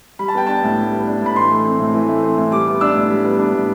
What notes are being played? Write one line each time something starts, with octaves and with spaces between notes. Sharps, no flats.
G3 B5
A5
B3 G5
D4 A5
A2
G3
B3
D4
A2 B5
E3 C6
A3
C4
A2
E3
A3
C4
A2
G3 D6
B3
D4 E6
A2
G3
B3
D4
A2